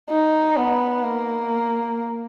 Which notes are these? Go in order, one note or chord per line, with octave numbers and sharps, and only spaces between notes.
D#4
B3
A#3